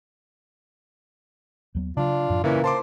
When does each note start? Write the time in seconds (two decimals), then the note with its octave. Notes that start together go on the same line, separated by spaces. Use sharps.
1.75 D#2 F#3 B3
1.97 C#3 F#3 D4 F4
2.29 F#2 A2 F3
2.44 A#2 C#3 E3 A#3 C#4
2.64 C5 A5 C6 D6